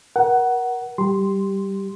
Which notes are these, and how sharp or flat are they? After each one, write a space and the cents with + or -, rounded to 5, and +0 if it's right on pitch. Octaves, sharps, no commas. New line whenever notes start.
A#4 +30 F#5 +15
G3 -15 G4 +0 C6 -5